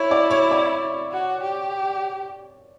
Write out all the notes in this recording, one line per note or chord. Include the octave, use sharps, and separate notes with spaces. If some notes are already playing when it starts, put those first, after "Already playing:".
Already playing: E4 C#5
D5
C#5
D5
F#4
G4